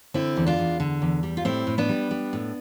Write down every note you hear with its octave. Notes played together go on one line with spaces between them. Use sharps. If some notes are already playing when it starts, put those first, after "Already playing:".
D3 C4 E4
E2
D4 F4
E2
D3
E2
G3
F4
A2 C4 E4
A2
B3 D4
G3
G3
A2